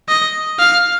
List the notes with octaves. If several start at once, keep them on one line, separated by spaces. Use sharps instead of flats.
D#5
F5